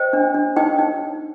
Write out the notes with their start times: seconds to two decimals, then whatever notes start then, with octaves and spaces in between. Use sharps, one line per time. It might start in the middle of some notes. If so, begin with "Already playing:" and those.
Already playing: C5 D#5 G5
0.13 D4
0.34 D4
0.56 D#4 D#5 G5
0.79 D#4